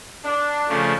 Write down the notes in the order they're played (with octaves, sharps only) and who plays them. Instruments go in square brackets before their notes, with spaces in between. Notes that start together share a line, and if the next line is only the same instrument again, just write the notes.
[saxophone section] D4
[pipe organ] C#3 F3 A3